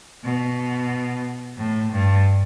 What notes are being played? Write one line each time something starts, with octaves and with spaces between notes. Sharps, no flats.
B2
A2
G2